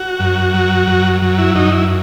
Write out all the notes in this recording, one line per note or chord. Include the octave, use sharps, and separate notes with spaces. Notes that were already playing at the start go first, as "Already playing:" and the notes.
Already playing: F#4
F#2
F#3
F#2
F#3
E4
F#2 D#4
E4